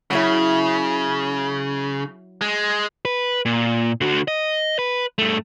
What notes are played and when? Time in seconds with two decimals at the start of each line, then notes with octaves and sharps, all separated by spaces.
0.11 C#3 F#3 E4 E5
2.41 G#3
3.05 B4
3.45 A#2
4.01 D3 F#4
4.28 D#5
4.79 B4
5.18 G2 A3